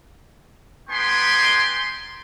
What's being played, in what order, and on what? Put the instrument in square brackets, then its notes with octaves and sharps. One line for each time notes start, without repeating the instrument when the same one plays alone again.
[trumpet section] G3 B3 D#4 G5 G#5 C6